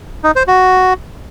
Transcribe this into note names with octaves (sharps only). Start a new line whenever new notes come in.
D#4
C5
F#4